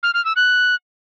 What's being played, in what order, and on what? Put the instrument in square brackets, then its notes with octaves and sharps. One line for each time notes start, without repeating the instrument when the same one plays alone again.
[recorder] F6
F6
E6
F#6